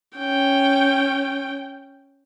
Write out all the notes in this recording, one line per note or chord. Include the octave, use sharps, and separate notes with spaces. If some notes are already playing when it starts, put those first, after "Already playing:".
C#4 G5